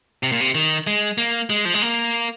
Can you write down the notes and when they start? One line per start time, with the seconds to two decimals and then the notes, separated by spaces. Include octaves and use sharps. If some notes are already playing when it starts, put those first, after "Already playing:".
0.23 C3
0.32 A#2
0.41 C3
0.55 D#3
0.87 G#3
1.18 A#3
1.50 G#3
1.65 F3
1.74 G#3
1.82 A#3